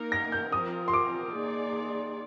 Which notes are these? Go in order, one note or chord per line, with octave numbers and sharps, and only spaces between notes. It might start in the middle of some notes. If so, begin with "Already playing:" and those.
Already playing: A#3 D#4 A#4
A#6
G6
F3 C4 F4 A#4 D#6
C6
D6
A#3 D#4 G#4 D5